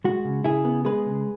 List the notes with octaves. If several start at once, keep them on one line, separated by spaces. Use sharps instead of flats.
G#3 F#4
C#3
C#3 E4 G#4
B3
G#3 G#4 B4
C#3